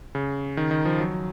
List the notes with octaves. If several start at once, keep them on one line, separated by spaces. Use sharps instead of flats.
C#3
D#3
D#3
F3
F#3